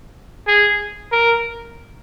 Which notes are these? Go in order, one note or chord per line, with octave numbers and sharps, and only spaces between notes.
G#4
A#4